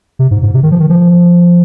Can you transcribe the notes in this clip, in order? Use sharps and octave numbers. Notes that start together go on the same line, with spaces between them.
C3
G#2
G#2
C3
D#3
F3
D#3
F3